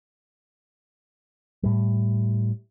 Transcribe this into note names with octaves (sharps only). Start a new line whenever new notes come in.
A2 G3